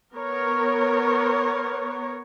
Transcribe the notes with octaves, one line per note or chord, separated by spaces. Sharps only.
B3 A#4 C#5